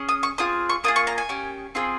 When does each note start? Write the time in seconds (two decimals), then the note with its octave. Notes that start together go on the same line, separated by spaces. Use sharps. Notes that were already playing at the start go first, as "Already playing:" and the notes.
Already playing: C#4 G#4
0.09 D#6
0.23 C#6
0.38 C4 F4 G#4 D#6
0.69 C#6
0.84 A#3 F4 G#4 D#6
0.96 C#6
1.07 A#5
1.18 G#5
1.29 C#4 G4
1.75 C4 F4 G#4